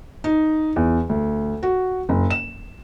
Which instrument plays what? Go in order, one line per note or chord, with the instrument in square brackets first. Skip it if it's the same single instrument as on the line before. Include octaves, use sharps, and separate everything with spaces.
[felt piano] D#4
E2
D2
F#4
F#1
E7